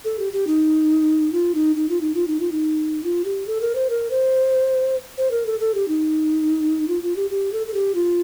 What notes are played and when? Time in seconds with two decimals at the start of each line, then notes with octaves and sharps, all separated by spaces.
0.04 A4
0.19 G4
0.33 G4
0.47 D#4
1.32 F4
1.55 D#4
1.76 D#4
1.89 F4
2.01 D#4
2.14 F4
2.27 D#4
2.40 F4
2.52 D#4
3.04 F4
3.25 G4
3.47 A4
3.61 A#4
3.75 C5
3.90 A#4
4.11 C5
5.18 C5
5.31 A#4
5.46 A4
5.60 A4
5.75 G4
5.88 D#4
6.88 F4
7.03 F4
7.16 G4
7.31 G4
7.53 A4
7.67 A4
7.74 G4
7.95 F4